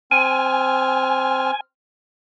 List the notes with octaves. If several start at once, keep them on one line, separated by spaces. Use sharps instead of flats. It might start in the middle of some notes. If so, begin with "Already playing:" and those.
C4 G#5 F6